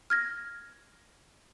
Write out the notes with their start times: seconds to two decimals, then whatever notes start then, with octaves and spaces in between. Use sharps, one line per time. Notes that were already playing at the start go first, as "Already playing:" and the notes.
0.10 F6 G#6 A#6